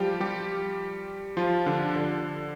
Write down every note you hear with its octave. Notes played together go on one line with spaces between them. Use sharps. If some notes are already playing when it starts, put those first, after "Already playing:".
Already playing: F3 G3 F4 G4
G3 G4
F3 F4
D3 D4
D3 D4